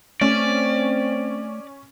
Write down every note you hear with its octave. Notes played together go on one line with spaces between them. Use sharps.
A3 C4 C#4 D5